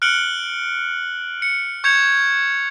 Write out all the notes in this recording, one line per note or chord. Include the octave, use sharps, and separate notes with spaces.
F6 F#6 C#7 D7 F#7 G7
C#7
C#6 G6 G#6 C#7 F7